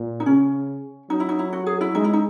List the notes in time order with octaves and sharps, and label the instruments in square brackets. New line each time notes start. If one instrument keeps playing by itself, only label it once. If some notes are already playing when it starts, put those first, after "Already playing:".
Already playing: [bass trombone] A#2
[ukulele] D#4
[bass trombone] C#3 [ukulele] C#4
[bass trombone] F#3 [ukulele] D#4
[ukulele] E4
D#4
E4
F#4
G#4
E4
[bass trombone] G#3 [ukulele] D#4
[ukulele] E4
D#4